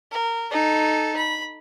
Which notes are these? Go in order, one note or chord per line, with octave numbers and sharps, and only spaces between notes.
A#4
D#4 A4
B5